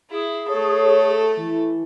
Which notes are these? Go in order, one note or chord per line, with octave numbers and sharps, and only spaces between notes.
E4 G#4
A3 A4 C#5
E3